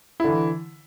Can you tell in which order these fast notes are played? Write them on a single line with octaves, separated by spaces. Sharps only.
E4 D3 E3